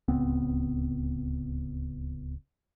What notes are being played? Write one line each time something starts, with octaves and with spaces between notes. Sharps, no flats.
D1 C#2 B3 C4